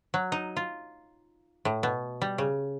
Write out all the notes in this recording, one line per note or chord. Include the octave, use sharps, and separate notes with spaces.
F#3
D#4
F4
A2
B2
G3
C#3